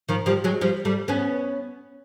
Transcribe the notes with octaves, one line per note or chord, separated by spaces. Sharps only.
D#3 F3
F3 G3
F#3 G#3
F3 G3
G3 A3
B3 C#4